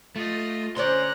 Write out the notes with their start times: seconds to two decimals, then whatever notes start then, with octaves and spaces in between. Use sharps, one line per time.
0.16 A3 F4 D#5
0.77 D3 C#4 C5 D5 A#5 C6 F#6